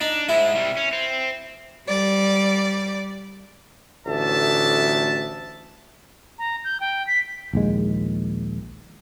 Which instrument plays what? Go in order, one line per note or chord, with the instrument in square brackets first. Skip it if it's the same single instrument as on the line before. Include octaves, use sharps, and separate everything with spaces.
[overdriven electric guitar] D4 [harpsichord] D#4
[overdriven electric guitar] G#2 G#3 [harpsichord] E4
[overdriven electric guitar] C3 G3
C#4
C4
[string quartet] G3 D5
[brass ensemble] A1 D2 E5 A5
[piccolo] A#5
G6
G5
B6
[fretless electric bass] A#1 D#2 G#3